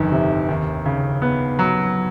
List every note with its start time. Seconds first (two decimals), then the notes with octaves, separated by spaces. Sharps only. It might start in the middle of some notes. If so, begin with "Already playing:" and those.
Already playing: G1 F2 D#3
0.12 C3
0.49 D#2
0.86 C#3
1.22 B3
1.59 F#3